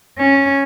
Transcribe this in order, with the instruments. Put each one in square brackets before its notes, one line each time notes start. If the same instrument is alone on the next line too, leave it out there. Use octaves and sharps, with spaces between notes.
[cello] C#4